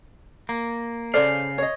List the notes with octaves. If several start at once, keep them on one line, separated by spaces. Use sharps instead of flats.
A#3
C#3 A4 C5 D5 F5
C#5 D#5